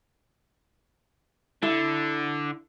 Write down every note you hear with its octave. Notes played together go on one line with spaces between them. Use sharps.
D3 E4